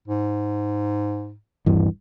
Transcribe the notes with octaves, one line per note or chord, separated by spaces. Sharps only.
G#2
D#1 G2 E3